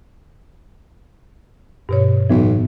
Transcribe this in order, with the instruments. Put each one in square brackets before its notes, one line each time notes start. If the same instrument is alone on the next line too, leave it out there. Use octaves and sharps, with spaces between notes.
[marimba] G2 B2 C#5
[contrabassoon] B1 [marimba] A2 E3